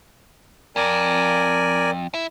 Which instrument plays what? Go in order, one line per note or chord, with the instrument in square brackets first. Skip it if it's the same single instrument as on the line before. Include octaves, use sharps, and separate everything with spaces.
[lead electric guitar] F2 [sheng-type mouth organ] A#4 D5 G#5
[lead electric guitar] E4